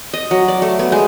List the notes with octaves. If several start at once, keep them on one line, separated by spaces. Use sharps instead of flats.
D#5
F#3
D5
A3
B3
G#3